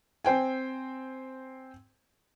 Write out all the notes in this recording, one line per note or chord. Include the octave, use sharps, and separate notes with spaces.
C4 C5 G5 G#5